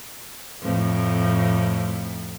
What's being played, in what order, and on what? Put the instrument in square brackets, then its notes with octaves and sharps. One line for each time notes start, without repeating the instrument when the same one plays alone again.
[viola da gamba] F2 A2